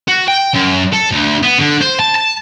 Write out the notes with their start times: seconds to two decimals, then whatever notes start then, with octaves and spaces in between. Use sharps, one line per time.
0.08 F#4
0.28 G5
0.55 F#2
0.93 A4
1.12 D2
1.42 B3
1.59 D3
1.81 C5
2.00 A5
2.15 A5